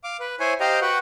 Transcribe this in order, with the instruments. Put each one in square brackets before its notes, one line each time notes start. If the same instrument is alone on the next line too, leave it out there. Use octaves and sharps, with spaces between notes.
[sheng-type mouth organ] F5 D6
B4
E4 C5 C#5 G#5
G4 C5 D#5 F5 G5 A#5
F#4 B4 F#5 G5